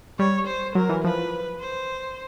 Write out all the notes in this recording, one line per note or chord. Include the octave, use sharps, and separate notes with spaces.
G3 C#5
C5
F#3 A#4
E3
F3 B4
C5